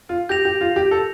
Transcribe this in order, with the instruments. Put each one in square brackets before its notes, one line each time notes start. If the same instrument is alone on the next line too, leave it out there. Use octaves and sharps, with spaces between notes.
[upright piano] F4
[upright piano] G4 [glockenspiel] G6 A#6 F7
[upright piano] G4
F4
G4
A4